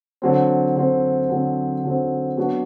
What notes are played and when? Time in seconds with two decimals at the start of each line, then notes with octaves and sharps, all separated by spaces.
0.22 D3 F#3 C4
0.75 D3 F#3 C4
1.29 D3 F#3 C4
1.84 D3 F#3 C4
2.37 F#3 B3 D4 F#4